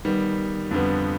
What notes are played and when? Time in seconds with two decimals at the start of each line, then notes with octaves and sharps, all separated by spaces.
0.05 D#3 G3 B3
0.71 F2 D3 G3 B3